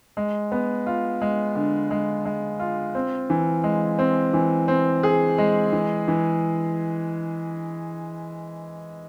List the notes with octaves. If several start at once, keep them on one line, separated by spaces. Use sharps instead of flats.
G#3
B3
F4
G#3
D3
G#3
G#3
F4
C4
E3
G#3
C4
E3
C4
G#4
G#3
E3
E3